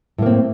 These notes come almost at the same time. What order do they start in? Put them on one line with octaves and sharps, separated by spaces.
A2 A#3 C4